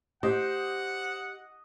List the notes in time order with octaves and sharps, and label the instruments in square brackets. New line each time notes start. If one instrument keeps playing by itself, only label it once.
[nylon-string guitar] G4 [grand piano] C5 [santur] D#5 [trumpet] F#5